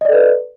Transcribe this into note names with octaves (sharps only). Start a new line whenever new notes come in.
A4 B4 D5 D#5